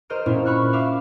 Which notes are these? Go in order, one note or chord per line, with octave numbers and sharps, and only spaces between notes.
A#4 C5 D#5 F6 D7
A#2 C4 C#4 E4
B5 C#6 F6 F#6
E5 F5 D6 F6